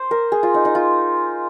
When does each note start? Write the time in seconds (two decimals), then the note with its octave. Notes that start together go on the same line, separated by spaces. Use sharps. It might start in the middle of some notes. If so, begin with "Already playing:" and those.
Already playing: C5
0.11 A#4
0.32 G#4
0.43 F4
0.54 D#4
0.65 D#4
0.75 F4